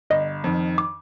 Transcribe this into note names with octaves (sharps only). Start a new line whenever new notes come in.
G1 D#5
F2 D#3
D6